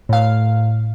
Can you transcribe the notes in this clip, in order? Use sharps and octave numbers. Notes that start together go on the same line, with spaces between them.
A2 F5